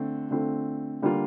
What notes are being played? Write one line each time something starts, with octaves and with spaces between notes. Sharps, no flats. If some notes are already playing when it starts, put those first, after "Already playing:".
Already playing: D3 A3 C4
D3 A3 C4 F4
D3 G3 A#3 F4